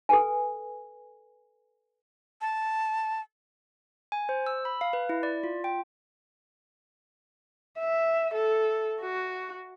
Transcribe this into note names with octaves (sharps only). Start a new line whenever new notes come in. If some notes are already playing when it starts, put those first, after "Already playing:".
A4 B4 G#5
A5
G#5
C5
E6
B5
F5
B4
E4
D5
F4
G5
E5
A4
F#4